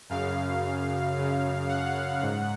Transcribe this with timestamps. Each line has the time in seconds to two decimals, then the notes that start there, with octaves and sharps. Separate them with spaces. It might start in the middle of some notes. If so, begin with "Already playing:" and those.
0.09 F#2 C#3 F5
1.16 F#2 C#3
1.69 F#5
2.22 G#2